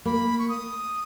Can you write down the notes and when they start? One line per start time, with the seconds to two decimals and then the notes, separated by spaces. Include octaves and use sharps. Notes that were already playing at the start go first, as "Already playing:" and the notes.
0.05 A#3 B5
0.39 C#6
0.49 D#6